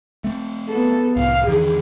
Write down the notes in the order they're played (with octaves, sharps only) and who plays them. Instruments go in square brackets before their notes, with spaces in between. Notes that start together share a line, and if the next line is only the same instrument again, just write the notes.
[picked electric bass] A3 C4
[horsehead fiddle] B3 A4
[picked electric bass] C2 A2 [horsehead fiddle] F5
[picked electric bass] E2 D3 D#3 [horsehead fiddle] G#4